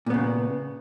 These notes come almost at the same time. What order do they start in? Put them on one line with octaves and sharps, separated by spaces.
A#2 B3 C#3